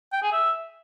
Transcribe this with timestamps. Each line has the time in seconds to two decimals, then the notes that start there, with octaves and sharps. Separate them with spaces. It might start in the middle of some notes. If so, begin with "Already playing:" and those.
0.12 G5
0.22 G#4
0.32 E5